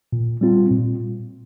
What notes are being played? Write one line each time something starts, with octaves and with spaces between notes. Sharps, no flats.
A#2
G3 C4 F4
A#2